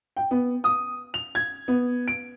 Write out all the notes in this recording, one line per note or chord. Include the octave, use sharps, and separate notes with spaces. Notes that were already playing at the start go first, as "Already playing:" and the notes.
G5
B3
D#6
F7
G#6
B3
D7